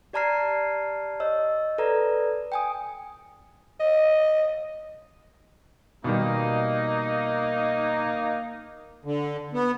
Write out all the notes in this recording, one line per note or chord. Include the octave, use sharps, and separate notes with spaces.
G4 D5 A5 A#5 F6 C7
C#5 D#5 E6
A4 B4 D5 A#5
G5 G#5 D#6
D#5
B2 D#3 G3 A#3 D#4
D3
B3